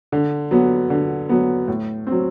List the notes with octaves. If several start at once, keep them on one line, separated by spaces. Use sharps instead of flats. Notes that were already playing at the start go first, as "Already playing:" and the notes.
D3
F#3 B3
D3
F#3 B3
A2
F#3 C4